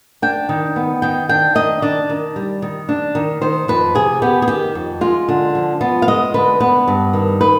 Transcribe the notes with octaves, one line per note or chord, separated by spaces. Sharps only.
D4 G5
D#3
B3
D#3 G5
D4 G5
D#3 D#5
D4 D5
D#3
G3
D#3
D4
D#3
D#3 C5
F2 B4
C3 G#4
B3 G4
G#4
D#3 G4
F2
G#3 F4
D3
F3
B3 F4
F5
G#3 D#5
D3 B4
B3 B4
G2
D#3
D#4 B4